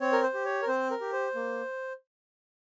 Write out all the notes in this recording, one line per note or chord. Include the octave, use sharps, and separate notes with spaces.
C4 C#5
A#4
C5
G4
C#5
A#4
C4 C5
A#4
G4
C5
A#3